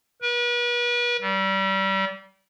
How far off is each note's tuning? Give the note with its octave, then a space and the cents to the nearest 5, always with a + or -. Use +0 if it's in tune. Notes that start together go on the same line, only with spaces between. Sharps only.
B4 -40
G3 -25